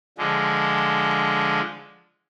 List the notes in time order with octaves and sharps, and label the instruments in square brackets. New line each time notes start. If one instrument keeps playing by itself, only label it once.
[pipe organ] D3 F3 G#3